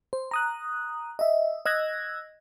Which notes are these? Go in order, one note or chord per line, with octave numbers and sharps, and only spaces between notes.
C5
A#5 D#6 F#6
D#5 E5
D#5 E6 F#6 G#6 A#6